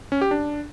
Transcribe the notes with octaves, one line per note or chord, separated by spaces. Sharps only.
C#4
G4
D4